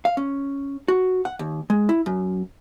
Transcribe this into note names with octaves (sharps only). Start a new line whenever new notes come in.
F5
C#4
F#4
F#5
D#2
G#3
E4
F#2